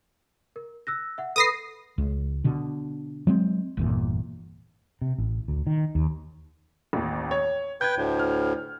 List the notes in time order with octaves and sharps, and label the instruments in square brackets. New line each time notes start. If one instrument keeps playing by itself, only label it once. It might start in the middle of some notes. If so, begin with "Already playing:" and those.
[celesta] A#4
E6 F#6 A#6
E5 F#5
[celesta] A4 B4 B5 [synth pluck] D#6 A#6 C7
[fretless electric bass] C#2
B2 D3
F#3 G#3 C4
G1 E2 A#2
C3
A1
D2
D#3
D#2
[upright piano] A1 D#2
C#5
[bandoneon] B4 G5 [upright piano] G6 G#6
[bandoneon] D2 A2
[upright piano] F6